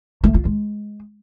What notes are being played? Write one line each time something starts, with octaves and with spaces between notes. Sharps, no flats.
A3
F4
G#3